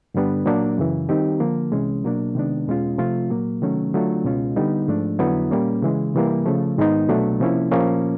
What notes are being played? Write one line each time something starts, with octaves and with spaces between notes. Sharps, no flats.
G2 D3 G3 B3 D4
A#2 F#3 A#3 D4
F#2 C#3 E3
D#3 G3 C4 D#4 G4
D3 F3 A#3
C2 C3 E3 G#3 C#4
B2 F#3 A#3 D4
C3 D#3 G#3 B3 D4
E2 B2 G#3 C#4 F4
C3 F3 A3 C4 F4
A#2 F#3 A#3
C3 D#3 F#3 A3 C#4
D3 F#3 A3 D4 F4
C#2 B2 G#3 C#4 F4
D3 G3 B3 D#4
G#2 F3 A3 D4
F2 D3 F#3 B3 E4
A#2 G3 A#3 C#4
C#3 E3 G#3
C3 E3 G3 A#3
C#3 F3 A3
G#2 D#3 G#3 B3 D#4
C2 B2 F#3 A3 D4
C3 F3 A#3 C#4 E4
A#2 F3 A#3 C#4